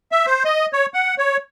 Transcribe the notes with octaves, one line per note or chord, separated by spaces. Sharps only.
E5
C5
D#5
C#5
F#5
C#5